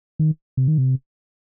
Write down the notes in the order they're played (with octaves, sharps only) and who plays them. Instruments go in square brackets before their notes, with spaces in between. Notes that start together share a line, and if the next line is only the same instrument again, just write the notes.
[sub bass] D#3
C3
D#3
C3